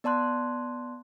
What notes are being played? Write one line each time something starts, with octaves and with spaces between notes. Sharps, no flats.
B3 D5 A5 C6 F#6